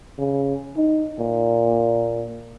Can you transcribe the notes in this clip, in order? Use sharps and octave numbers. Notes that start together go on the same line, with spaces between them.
C#3
D#4
A#2